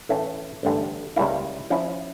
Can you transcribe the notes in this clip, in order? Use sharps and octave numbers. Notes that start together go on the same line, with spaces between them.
A2 E3 A3 C#4
A1 G2 D3 A3
C#2 C#3 G3 A#3 E4
F3 C#4 E4